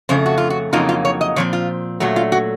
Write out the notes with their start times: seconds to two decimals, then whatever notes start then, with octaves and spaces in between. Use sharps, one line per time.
0.09 F2 C#3 A3 C5
0.26 F#4
0.38 F4
0.50 F#4
0.73 F2 C#3 F#3 A#3 D#4 F4
0.89 F4
1.05 C#5
1.21 D#5
1.36 A#2 F3 C4 C#5
1.53 F4
2.00 A#2 F#3 A3 F#4
2.16 F4
2.32 F#4